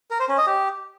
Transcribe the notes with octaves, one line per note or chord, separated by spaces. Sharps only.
A#4
C5
C#4
D#5
G4